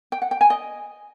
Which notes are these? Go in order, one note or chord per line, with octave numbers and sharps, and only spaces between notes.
G5
F#5
G5
G#5
D#5